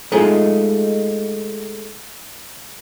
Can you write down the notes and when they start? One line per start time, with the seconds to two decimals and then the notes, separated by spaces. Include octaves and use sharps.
0.12 G#3 A3 D#4 F4 G#4